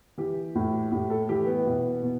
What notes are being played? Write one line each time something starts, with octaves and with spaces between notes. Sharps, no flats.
E3 G4
A2
A2 G4
A4
E3 G4
B3
B2
B2